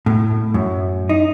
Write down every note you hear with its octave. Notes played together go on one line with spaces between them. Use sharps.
A2
F#2
D#4